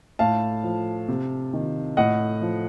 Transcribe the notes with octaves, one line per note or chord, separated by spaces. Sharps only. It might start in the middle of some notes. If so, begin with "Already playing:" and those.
A2 F5 A5
F3
C3
D#3
A2 D#5 F#5
F3